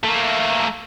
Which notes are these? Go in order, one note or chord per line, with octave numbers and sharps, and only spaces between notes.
A3 A#3